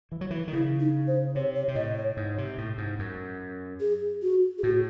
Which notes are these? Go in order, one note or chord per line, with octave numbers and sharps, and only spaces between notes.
E3
F#3
E3
D#3
C#3 E4
D#4
C5
C3 C#5
C#5
C3
A2 D#5
C#5
G#2
C3
A2
G#2
F#2
G#4
F#4
G#4
A2 F#4